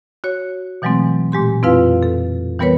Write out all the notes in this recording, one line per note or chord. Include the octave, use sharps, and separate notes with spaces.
F#4 C#5
B2 E3 F#3 G#3 A3 C4
A#2 G#3 G4 C6
F2 C4 E4 F4 B4 F5
A4
E3 G3 B3 A#4 B4 C#5